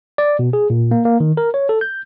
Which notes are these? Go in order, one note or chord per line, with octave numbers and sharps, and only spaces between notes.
D5
B2
G#4
A#2
A#3
A#3
D#3
A#4
C#5
A4
G6